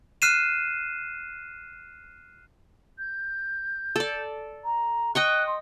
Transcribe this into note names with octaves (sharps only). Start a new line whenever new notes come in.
F6 F#6 C7 D#7 E7
G6
A4 D5
A#5
D#5 G5 C#6 F#6
C6